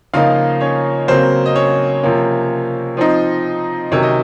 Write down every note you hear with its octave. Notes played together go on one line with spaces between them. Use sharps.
C#3 F3 A#3 D#4 F4 F5
C#4 C#5
C#3 F#3 A#3 C4 C5
D#5
C#4 C#5
C3 F3 A#3 C#4
F3 C4 D#4
C3 D#3 F#3 C#4 C#5
D#5